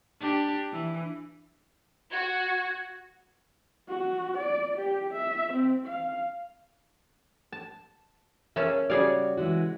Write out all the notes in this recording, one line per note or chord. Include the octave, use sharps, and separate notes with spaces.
D4 G4
E3
F#4 G#6
F#4
D5
G4
E5
C4
F5
A5
A#3 C#4 G#4 E5 A5
C#3 G3 F#4 G#4 D5 F5
E3 G#3 F#4